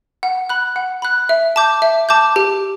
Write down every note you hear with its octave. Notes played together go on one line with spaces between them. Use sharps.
F#5
B5 F#6
F#5
B5 F#6
E5
A5 D6 G6
E5
A5 D6 G6
G4